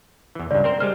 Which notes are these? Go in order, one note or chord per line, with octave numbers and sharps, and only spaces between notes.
E2 E3
C#2 G2 D5
C4 A#4 C5
G3 G#3 C5 F6